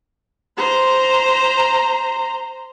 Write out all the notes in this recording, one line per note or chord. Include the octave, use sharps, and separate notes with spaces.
C5 A#5